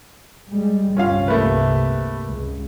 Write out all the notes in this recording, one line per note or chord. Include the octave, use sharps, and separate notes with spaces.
G3 G#3
G1 C2 C3 C#4 F4 F5
A3 A#3 B4
C#2